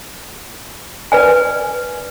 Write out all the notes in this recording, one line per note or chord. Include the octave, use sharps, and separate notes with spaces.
B4 D5 G#5